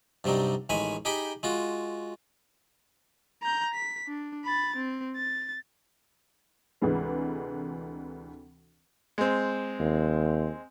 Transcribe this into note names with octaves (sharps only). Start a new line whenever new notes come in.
G2 C3 F#3 G3 D#4
A1 D#3 G#3 G#5 B5
D#4 G4 G#4 G5 B5
G#3 F4 F#4
A#5 G6
B6
D4
B5 A6
C4
A6
D2 C3 E3 G#3
G#3 C4
D#2